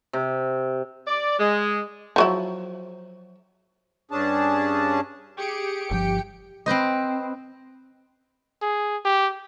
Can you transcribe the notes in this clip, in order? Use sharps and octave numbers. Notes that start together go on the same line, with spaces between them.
C3
D5
G#3
F3 F#3 E4
G2 C#4 D4 G#4 A5
G4 G#4 C#7 D7
G1 F3 G5
C4 B4 C5 D#5
G#4
G4